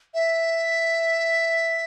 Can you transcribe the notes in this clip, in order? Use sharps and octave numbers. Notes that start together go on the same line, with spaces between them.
E5